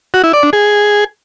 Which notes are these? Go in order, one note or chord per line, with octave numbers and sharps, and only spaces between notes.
F#4
E4
D5
D4
G#4